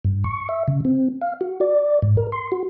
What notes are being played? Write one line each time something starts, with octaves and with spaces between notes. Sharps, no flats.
G2
C#6
E5
C#3
C4
F5
F#4
D5
G#2
A#4
C6
F#4